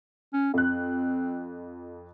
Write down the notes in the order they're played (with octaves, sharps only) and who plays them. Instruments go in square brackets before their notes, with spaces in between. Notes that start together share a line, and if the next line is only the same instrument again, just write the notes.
[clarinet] C#4
[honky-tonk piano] F2 F#6 [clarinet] C4